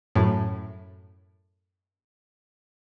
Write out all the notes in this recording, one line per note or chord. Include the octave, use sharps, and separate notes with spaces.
F#2 A2